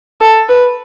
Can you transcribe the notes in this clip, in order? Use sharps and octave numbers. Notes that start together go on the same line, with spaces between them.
A4
B4